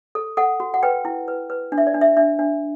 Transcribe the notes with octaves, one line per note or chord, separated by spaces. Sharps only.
A4
A4 F#5
F#4
F#5
B4 G5
E4
B4
B4
D4
E5
D5
D4
E5
D4 E5
D4